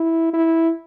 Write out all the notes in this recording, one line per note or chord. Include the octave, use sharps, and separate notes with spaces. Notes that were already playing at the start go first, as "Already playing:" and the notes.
Already playing: E4
E4